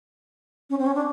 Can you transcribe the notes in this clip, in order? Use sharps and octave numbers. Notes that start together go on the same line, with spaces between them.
C#4
C4
C#4
D4